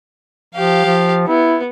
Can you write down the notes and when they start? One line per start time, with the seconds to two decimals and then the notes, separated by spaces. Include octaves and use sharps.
0.54 F3 G4 F5
0.85 F3
1.28 B3 E4